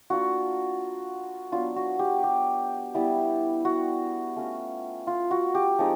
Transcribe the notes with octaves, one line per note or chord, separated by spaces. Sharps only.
A#3 D4 F4 F#4
F#3 B3 D4 F4
F#4
G4
G4
G3 B3 E4
F#4
A3 C#4 F4
F4
F#4
G4
F3 G#3 C4 D#4